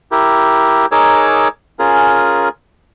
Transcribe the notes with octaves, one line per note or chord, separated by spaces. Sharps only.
E4 G4 A#4
D#4 G#4 A#4 C#5 D6 E6
C#4 F4 G#4 A#4